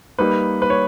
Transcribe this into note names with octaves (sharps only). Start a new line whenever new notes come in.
G3 A#3 D#4 B4
B4
C#5